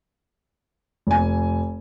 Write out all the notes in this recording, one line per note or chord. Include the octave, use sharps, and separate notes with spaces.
F1 G#5